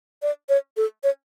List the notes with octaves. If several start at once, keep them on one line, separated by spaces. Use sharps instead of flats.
D5
C#5
A4
C#5